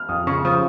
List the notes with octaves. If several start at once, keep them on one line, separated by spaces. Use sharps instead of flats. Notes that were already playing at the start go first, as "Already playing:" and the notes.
Already playing: F6
F2 D#6
C#3 C#6
F3 D#6